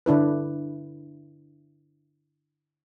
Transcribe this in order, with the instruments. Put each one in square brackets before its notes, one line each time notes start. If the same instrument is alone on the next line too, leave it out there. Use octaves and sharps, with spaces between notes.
[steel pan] D3 D4 E4 B4